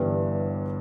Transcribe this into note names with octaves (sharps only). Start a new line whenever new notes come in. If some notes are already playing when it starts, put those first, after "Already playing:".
Already playing: G1 G2 E3 G3 D4